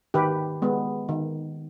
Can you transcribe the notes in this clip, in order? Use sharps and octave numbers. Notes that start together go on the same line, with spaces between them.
D#3 G4 B4
G#3 B3
D#3